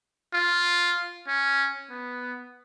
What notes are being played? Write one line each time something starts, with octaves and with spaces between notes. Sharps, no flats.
F4
C#4
B3